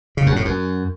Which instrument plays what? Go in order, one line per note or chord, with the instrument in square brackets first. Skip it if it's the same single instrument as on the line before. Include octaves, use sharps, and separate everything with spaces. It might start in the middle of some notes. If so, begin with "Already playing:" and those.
[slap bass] C#3
F#2
A2
F#2